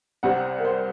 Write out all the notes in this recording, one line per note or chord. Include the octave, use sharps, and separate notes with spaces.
C2 C3 G3 C4 F#5
A#4
C5